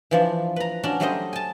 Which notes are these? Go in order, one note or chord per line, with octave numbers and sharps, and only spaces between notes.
E3 F3 D4
B4 A#5
C#4 D4 F#4
F#3 G3 A3 D4 C5 D#5
G#5 A5